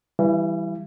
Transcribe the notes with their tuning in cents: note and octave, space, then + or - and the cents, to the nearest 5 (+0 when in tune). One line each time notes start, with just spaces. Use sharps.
E3 +0 G3 +0 F5 -45